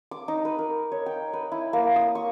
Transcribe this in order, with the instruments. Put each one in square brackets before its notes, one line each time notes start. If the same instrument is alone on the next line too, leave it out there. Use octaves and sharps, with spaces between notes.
[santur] D6
D#4
B4
A#4
C#5
G5
B4
E4
A#3
D#6
C#6